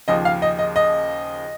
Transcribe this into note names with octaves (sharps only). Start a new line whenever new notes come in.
D#2 C#3 F3 D#5
F5
D#5
D#5
D#5